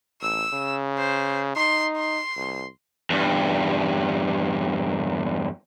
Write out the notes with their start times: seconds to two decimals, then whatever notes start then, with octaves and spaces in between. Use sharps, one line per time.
0.22 A1 E6
0.53 C#3
0.98 C5
1.56 D#4 C6
1.97 C6
2.37 C2
3.10 E2 G2